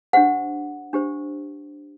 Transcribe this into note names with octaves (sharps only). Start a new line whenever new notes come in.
D4 G4 C5 F#5
D4 G4 C5